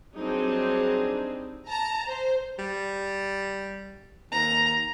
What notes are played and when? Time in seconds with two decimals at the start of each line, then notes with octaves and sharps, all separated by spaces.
0.14 F#3 G3 C4 D4 D#4 G#4
1.66 A5 A#5
2.06 C5
2.59 G3
4.32 D#2 A#5